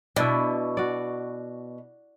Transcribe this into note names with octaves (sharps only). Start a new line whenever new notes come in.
B2 D4 E4
F#4 D5